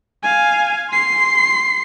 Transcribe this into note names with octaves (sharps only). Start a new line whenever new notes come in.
F5 G#5
C6 C7